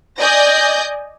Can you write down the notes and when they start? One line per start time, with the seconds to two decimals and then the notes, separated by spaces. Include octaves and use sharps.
0.20 D5 D#5 G#5 G6 A#6